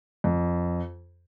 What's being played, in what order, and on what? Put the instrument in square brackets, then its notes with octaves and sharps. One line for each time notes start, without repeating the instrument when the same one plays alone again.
[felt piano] F2